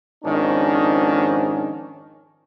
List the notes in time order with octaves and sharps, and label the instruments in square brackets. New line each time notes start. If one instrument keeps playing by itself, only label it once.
[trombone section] F2 G#2 D#3 C#4 D4